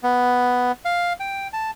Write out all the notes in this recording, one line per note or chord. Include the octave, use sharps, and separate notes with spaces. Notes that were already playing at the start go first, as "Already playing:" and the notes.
B3
F5
G5
A5